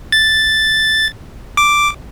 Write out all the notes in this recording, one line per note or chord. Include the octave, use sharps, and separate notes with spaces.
A6
D6